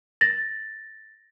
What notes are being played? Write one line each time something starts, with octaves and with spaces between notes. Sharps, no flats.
A6 A#6